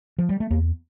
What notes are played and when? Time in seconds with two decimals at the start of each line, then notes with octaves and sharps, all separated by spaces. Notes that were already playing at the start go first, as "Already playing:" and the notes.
0.18 F3
0.29 G3
0.40 A3
0.50 E2 A#3